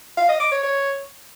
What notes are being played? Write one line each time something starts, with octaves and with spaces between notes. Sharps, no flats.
F5
D#5
D6
C#5
C#5